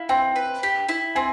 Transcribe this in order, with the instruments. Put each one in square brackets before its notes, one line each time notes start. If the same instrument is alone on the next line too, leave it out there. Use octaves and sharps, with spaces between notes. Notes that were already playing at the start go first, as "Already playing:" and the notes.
Already playing: [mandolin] E4 [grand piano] F5
[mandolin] C4 [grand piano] G5
[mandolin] B4
G4
E4
[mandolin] C4 [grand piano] G#5